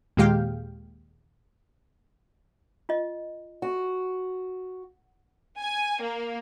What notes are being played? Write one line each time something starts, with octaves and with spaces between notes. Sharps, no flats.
D#2 A#2 G#3 G4 F5 G5
F4 D#5
F#4
G#5
A#3